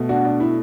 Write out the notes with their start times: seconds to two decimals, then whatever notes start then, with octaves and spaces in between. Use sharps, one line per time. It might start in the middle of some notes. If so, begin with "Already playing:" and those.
Already playing: B2 A3
0.09 D4 F#4
0.25 D4
0.40 E4